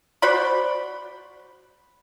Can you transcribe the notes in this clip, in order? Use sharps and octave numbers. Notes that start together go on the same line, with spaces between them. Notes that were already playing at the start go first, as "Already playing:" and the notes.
F#4 C5 D5 B5